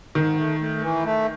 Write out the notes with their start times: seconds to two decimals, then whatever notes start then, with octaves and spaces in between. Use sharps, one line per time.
0.15 G#2 D#3
0.38 A3
0.60 A3
0.82 E3
1.05 A3